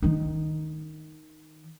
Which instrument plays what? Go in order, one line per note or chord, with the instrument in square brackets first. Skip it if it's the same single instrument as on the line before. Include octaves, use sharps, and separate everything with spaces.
[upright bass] D#3 D#4